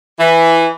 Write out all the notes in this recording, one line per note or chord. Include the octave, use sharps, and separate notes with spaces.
E3